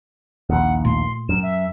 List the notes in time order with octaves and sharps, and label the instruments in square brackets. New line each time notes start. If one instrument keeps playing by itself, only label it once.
[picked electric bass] A#1 D#2 [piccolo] F#5
[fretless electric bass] A#2 A3 [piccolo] C6
[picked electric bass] F#2 [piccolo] E7
[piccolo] E5